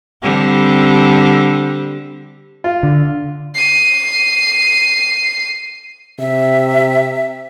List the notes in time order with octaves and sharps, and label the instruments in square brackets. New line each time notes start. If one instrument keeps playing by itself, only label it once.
[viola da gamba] D3 G3 C4
[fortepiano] F4
[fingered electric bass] D3
[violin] C7 D#7
[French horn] C3 [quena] E5